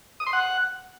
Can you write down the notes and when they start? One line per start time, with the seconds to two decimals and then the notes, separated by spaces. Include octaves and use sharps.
0.20 D#6
0.26 C6
0.33 F#5